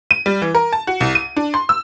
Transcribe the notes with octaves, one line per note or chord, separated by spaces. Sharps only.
D#7
G3
E3
A#4
A5
F#4
C2
D#7
D4
C6
E6